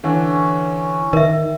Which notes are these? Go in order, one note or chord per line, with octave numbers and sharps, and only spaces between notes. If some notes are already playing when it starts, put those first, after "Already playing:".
D3 E3 C#4
D#3 A#4 E5